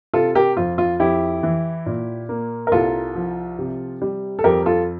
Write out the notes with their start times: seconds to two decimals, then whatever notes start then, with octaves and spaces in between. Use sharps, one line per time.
0.14 C3 F4 A4
0.35 G4 A#4
0.57 F2 F4
0.78 F4
1.00 F2 E4 G4
1.43 E3
1.86 A#2
2.29 A#3
2.67 A#4
2.72 C2 F4 A4
3.15 F3
3.59 C3
4.02 G3
4.39 A4
4.44 F2 G4 A#4
4.66 F4 A4